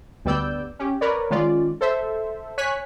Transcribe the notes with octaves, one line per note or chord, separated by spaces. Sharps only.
D2 G3 B3 D5 E6 G6
C#4 G4
A#4 B4 C#5 D5
D#3 G#3 C#4 F4 D5
A4 C5 E5
C#5 G#5 C#6 F#6 B6